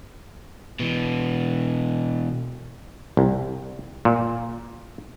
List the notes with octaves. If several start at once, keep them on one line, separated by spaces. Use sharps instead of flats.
B2 E3
C2
A#2